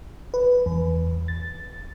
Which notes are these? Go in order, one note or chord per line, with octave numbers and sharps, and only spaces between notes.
B4
E2
A6